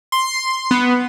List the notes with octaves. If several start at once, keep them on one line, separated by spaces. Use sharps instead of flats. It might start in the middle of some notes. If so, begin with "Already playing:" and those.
C6
B3